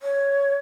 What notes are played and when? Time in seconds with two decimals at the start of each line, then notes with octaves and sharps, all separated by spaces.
0.02 C#5